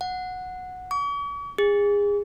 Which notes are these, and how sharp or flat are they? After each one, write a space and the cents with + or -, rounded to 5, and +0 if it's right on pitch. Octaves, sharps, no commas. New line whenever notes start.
F#5 -10
C#6 +45
G#4 -25